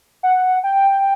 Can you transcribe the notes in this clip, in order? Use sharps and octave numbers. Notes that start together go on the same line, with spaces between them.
F#5
G5